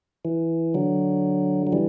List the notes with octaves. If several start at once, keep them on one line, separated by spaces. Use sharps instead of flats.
E3
D3 F#3
F#3
E3 G3